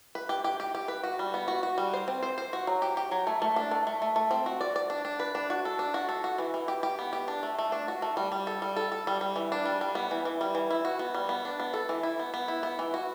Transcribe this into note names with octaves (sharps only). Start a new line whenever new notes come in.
B4
G4
G4
G4
G4
B4
F#4
G3
B3
F#4
F#4
G3
C5
C4
C5
C5
F#4
F#3
G4
G4
F#3
A3
A3
D4
A3
A3
A3
A3
C4
F#4
D5
D5
D4
D4
B4
D4
F#4
A4
D4
F#4
A4
F#4
E3
E3
G4
G4
B3
G4
D4
A3
A3
D4
F#4
A3
G3
G3
A4
G3
A4
A4
G3
G3
E3
D4
G3
G3
B3
E3
E3
G3
E3
E4
F#4
B3
G3
B3
D4
B3
A4
E3
E4
B3
B3
E4
B3
E3
F#4